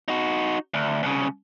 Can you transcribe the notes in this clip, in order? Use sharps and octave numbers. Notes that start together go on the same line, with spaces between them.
D#4 F#4
D2
C2 C#3